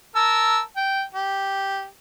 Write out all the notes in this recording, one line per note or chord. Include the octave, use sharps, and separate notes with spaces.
A#4 A5 E6
G5
G4